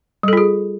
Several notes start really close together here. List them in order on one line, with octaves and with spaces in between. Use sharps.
G3 A4 F4 G#4